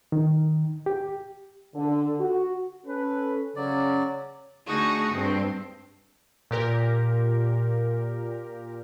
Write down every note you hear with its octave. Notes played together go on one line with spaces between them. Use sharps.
D#3
G4
D3
F#4
C#4 A4 B4
C#3 F#3 C#4 D5
D3 A3 D#4 F#4 G#4
G2 C4
A#2 G4 A#4